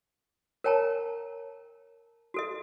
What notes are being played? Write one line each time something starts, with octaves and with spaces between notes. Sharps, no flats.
A#4 C#5 G5 A5 A#5
F#4 A4 D#5